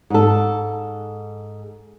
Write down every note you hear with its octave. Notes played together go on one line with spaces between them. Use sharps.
G#2 A4